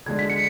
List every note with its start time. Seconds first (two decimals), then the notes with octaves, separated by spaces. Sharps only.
0.06 D2 D3 G#3 G#6
0.19 B6
0.30 C#7